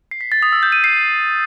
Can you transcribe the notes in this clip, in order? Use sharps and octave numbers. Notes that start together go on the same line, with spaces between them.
C7
B6
A6
D#6
E6
G6
D#7
C7